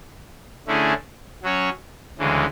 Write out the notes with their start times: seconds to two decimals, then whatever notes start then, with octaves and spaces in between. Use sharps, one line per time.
0.67 D3 A3 C#4 E4 G#4
1.43 F#3 C#4 F#4 C#5
2.19 D2 C#3 E3 G#3